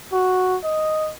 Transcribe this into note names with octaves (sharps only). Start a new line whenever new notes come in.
F#4
D#5